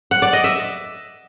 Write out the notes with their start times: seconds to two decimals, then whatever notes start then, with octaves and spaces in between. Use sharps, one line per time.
0.11 F#5
0.22 D5
0.33 D#5
0.44 E5